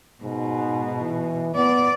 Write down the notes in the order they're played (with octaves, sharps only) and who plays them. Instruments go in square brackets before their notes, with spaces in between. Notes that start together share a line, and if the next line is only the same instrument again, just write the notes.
[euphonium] G#2 [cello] B2
[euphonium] E3
[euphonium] B3 [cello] D5